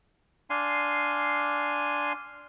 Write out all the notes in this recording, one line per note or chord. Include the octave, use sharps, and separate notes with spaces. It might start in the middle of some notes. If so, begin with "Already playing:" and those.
D4 F5 G#5 C6